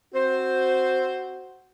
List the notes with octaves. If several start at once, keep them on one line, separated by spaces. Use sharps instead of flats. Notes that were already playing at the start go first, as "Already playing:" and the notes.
C4 F#4 C5